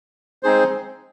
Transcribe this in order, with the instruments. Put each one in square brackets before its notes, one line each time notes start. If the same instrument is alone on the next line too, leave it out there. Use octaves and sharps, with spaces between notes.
[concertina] G#3 C4 D#4 G#4 C5